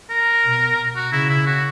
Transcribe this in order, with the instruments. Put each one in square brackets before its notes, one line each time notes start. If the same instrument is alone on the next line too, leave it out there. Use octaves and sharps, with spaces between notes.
[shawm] A#4
[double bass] B2
[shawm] F#4
[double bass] C#3 [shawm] E4
[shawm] E4
F#4